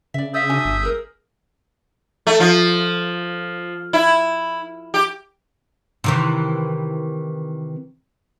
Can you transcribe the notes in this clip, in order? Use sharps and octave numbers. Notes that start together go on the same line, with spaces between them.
C#3 D5 E5
D5 E5 F5 D#6 E6 G6
D4 F#4 G#5
G1
G#4 A#4
A3
F3
E4
G4
C3 D#3 E3